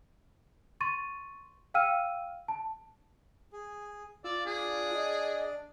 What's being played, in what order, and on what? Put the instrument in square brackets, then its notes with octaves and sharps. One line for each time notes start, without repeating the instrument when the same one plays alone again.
[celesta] C6 C#6 A6 D#7
F5 G5 E6 F6 D#7
A5
[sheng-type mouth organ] G#4
[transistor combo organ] F4 [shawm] D5 [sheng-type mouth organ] E6
[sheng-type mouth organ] D4 D5 [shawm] G#4
[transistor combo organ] D#5